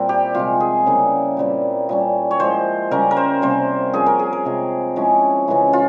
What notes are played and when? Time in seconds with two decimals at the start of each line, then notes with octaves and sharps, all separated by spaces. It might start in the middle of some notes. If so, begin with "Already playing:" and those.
Already playing: A#2 G3 C4 E4 A#4
0.09 G4
0.34 C3 F3 G#3 F4
0.60 G#4
0.86 C#3 G3 A#3 E4
1.37 A#2 G3 C4
1.89 A#2 G3 C#4
2.31 C#5
2.40 F3 G#3 E4 C5
2.91 C#3 G3 C#4 A#4
3.11 A#4
3.17 C5
3.42 C3 G3 A#3 C#4 C5
3.93 F3 A#3 C#4 G#4
4.06 A#4
4.19 G#4
4.33 A#4
4.45 C3 F3 G#3
4.96 F3 G#3 C#4 E4
5.48 C#3 E3 G#3 E4
5.73 F4